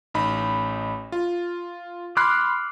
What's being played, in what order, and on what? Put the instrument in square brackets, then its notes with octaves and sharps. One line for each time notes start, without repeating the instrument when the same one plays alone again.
[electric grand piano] A1 D#4 B5
F4
[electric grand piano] B5 C6 C7 [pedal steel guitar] D6 F6 F#6